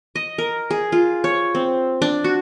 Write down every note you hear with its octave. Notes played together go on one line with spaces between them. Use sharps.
D#5
A#4
G#4
F4
C#5
C4
D4
F#4